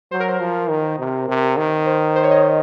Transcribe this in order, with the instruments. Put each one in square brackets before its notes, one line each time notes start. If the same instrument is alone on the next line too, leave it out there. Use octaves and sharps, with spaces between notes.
[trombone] F#3 [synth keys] C5
[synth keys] A#4
C5
[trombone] F3
D#3
C3
C3
D#3
[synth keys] C5
C5
C#5
D#5